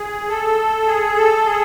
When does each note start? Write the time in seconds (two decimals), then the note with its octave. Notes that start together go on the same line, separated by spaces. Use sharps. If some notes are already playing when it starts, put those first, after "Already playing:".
Already playing: G#4
0.28 A4
0.87 G#4
1.16 A4
1.46 G#4